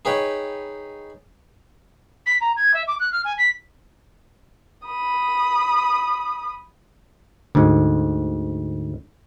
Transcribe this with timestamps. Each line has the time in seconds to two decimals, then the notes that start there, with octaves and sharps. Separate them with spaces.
0.05 D#4 G#4 B4 C#5 G5
2.26 B6
2.41 A#5
2.57 G#6
2.74 E5
2.87 D6
3.00 F#6
3.12 F6
3.25 G#5
3.38 B6
4.86 B5 D#6
7.55 D2 G#2